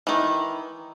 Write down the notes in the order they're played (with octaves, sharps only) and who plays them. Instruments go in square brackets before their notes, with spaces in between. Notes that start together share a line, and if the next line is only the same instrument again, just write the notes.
[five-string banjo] D#3 E3